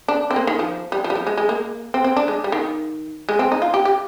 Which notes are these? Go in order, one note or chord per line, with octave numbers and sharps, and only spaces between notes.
D4
C4
A#3
D#3
F3
G3
F3
G3
F3
G#3
G#3
A#3
C4
C4
D4
G#3
G3
D#3
G#3
C4
D#4
F4
G4
G4